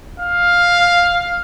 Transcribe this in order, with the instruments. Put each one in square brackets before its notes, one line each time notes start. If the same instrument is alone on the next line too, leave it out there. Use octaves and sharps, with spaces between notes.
[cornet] F5